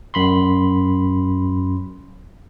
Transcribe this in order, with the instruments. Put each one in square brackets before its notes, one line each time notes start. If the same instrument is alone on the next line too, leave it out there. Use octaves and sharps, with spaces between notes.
[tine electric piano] F#2 B5 C6